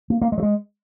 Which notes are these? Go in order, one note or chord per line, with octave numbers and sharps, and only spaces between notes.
A#3
A#3
G#3
F#3
G#3